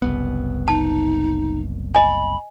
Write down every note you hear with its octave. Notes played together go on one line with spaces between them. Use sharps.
F#1 C2 B3
D#4 A5
D#5 G#5 B5